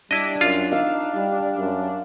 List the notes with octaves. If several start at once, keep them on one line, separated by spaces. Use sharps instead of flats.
G3 D4 E4 D#5
F#2 F4
D#4 F5 E6
G3
F#2